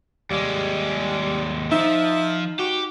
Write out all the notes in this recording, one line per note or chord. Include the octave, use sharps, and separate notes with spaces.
D#2 G3 G#3
F3 D#4 E5
F#4 G4